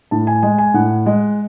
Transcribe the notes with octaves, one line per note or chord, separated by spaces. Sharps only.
A2 A5
G#5
G#3 G#5
G#5
A2 F#5
G#3